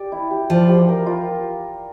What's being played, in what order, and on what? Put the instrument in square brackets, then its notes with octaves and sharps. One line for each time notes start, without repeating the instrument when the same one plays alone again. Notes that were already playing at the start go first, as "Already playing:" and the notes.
Already playing: [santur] G4 D5
E4
G4
[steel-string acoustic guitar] F3 [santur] D5
[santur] G4
A#4
F4